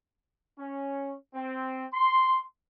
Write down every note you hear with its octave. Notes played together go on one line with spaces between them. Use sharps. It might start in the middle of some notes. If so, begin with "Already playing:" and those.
C#4
C4
C6